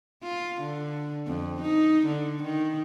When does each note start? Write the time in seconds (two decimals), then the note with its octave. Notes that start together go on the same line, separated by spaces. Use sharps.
0.23 F4
0.61 D3
1.27 F2
1.62 D#4
2.07 D3
2.43 D#3